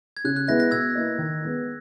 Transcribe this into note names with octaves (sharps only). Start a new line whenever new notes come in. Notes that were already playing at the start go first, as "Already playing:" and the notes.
G#6
C#3 F#6
F#6
G#3 B3 E4 F#6 A#6
F#6 A#6
B2 E6 G#6
A#3 E4 B4 D#5
D#3
G#3 B3 D#4